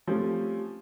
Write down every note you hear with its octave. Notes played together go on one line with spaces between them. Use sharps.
F3 G3 A3 C4 C#4